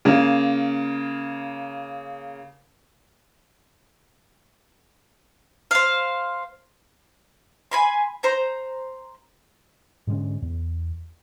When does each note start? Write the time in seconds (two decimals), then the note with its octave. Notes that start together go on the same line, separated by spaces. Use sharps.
0.05 C#3 A#3
5.71 C5 F5
7.71 G#5 B5 C6
8.23 C5 A#5 G6
10.07 G#2 D3 G#3 C#4
10.42 E2